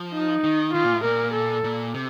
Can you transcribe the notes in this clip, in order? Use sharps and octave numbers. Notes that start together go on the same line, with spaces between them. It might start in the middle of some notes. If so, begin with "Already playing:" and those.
Already playing: F3
D#4
D#3
D#3 F4
A#2
A2
A#2 A#4
A4
A#2
C3